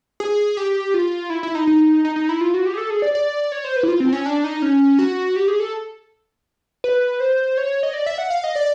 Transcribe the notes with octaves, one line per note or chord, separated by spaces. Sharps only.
G#4
G4
F4
E4
E4
D#4
D#4
D#4
D#4
E4
F4
F#4
G4
G#4
A4
G#4
D5
D5
C#5
C5
B4
E4
F4
C4
C#4
D4
D#4
C#4
F#4
G4
G#4
A4
B4
C5
C#5
D#5
D5
E5
F#5
F5
D#5
D5